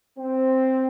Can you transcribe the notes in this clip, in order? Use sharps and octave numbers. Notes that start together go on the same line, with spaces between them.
C4